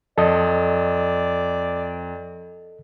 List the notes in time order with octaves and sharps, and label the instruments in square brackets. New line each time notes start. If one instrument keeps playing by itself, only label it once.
[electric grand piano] F2 [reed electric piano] A4 D#5 [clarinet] D5